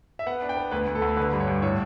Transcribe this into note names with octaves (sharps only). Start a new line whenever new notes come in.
E5
B3 F#5
D4
G5
B3
D2 B4
D2
A4
D2
D3 B4
G2
C#5
G2
A2 C#5